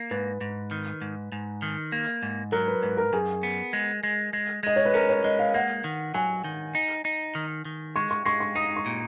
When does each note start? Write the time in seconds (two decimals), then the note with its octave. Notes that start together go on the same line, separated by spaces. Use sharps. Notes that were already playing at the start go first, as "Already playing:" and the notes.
Already playing: A#3
0.11 G#2 B4
0.41 G#2
0.71 D#3
1.02 G#2
1.32 G#2
1.62 D#3
1.92 A#3
2.23 G#2
2.52 F#3 A#4
2.68 B4
2.83 G#2 B4
2.97 A#4
3.13 F#2 G#4
3.43 B3
3.73 G#3
4.03 G#3
4.33 G#3
4.63 G#3 D#5
4.76 C#5
4.85 B4
4.94 C#4 A#4
5.09 C#5
5.24 G#3 D#5
5.39 F5
5.54 A#3 F#5
5.84 D#3
6.14 F#3 G#5
6.44 D#3
6.75 D#4
7.05 D#4
7.35 D#3
7.65 D#3
7.96 G#3 C#6
8.11 C#6
8.26 G#3 C#6
8.40 C#6
8.55 D#4 D#6
8.76 C#6
8.86 A#2